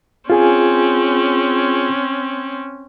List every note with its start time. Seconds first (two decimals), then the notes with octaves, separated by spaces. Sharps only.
0.30 C4 C#4 F4 G#4 G#5